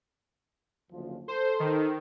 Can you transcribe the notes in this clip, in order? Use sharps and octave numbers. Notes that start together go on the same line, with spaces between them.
F#1 D2 F3
A4 C5
D#3